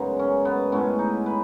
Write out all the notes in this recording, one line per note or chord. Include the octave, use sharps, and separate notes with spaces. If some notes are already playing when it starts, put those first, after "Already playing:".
Already playing: F#2 C#3 G#3 B3 D#4
C#4
B3
A2 G#3 B3 C#4
D#4
B4